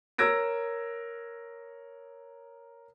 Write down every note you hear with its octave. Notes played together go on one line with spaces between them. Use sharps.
A#4 C#5 E6 G#6 A#6 D7